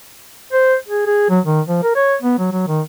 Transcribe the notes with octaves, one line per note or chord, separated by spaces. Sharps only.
C5
G#4
G#4
F#3
D#3
F3
A#4
C#5
B3
F#3
F#3
D#3